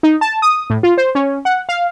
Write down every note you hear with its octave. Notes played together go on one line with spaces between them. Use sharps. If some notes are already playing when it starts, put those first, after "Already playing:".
D#4
A5
D#6
A2
F4
C5
C#4
F#5
F5